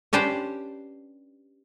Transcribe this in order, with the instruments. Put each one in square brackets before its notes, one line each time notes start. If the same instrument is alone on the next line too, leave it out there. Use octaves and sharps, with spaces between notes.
[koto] C#4 D4 G4 B4 C5